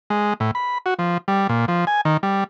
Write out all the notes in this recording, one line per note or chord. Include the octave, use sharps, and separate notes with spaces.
G#3
A2
B5
F#4
F3
G3
A#2
F3
G#5
D#3
G3